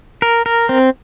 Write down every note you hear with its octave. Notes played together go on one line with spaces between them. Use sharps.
A#4
A#4
C4